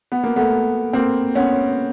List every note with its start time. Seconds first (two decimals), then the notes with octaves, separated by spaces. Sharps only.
0.12 B3
0.24 A#3
0.36 A3 B3
0.93 A#3 C4
1.35 B3 C#4